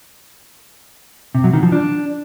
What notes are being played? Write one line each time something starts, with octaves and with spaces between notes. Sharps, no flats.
C3
F#3
D#3
F3
D4